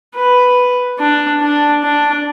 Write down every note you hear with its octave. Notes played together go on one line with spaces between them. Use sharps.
B4
D4
D4
D4